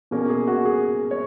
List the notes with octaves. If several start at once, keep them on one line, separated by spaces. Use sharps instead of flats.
B2 A#3 C#4 G#4
G#4
F#4
G#4
C#5